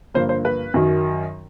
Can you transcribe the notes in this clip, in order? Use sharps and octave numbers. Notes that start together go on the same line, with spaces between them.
G2 D3 F3 A#3 C5
C5
B4
F#2 D#3 F#3